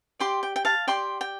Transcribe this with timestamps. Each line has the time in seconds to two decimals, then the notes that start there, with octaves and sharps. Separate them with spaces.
0.20 G4 D5 G5 C6
0.43 G5
0.56 G5
0.65 F5 A5
0.87 G4 D5 G5 C6
1.21 G5